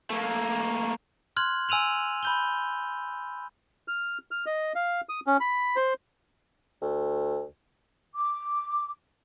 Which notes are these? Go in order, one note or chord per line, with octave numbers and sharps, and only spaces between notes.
A3 A#3
C6 F6 F#6 G#6 F#7
G#5 E6 D#7 F7 F#7
B5 G6 G7
F6
F6
D#5
F5
D#6
C#4
B5
C5
D2
D6